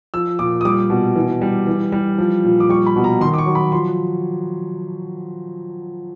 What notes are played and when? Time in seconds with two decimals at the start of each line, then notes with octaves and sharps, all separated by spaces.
0.14 F3 E6
0.39 A#2 D6
0.61 D#6
0.65 G3 D6
0.90 B2
1.16 E3
1.41 G3
1.67 E3
1.92 G3
2.18 F3
2.44 A#2
2.60 D6
2.69 G3 C#6
2.86 B5
2.96 B2
3.04 A#5
3.21 D#3 C6
3.34 D6
3.38 C#6
3.46 F#3
3.55 B5
3.72 F3 C6